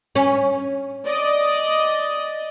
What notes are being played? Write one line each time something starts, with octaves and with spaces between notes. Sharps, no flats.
C#4
D5 D#5